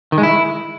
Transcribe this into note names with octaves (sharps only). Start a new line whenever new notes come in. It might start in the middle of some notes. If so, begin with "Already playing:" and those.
D#3
G#3
E4